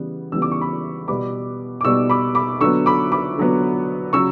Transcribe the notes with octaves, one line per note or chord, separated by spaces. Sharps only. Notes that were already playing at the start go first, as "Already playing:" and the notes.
Already playing: C#3 E3 G3 B3
C#3 E3 G3 B3 E6
D6
C#6
B5 D6
B2 G3 B3 B5 D6
D6
B2 G3 B3 C#6 E6
B5 D6
B5 D6
D3 F#3 B3 C#6 E6
B5 D6
B5 D6
D3 F#3 B3
C#3 F#3 C#6 E6